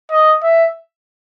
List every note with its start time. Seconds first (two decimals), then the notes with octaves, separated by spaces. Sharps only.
0.11 D#5
0.43 E5